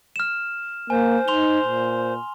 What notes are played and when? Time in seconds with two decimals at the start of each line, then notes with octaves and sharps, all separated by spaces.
0.16 F6 E7
0.90 A#3 C5 G#5
1.28 D#4 C6 F7 G7
1.65 A#2